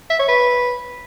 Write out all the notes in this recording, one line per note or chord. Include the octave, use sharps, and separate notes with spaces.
E5
C#5
B4